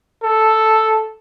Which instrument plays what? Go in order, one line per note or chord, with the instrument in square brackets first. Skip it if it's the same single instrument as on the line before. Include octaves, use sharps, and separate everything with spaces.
[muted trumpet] A4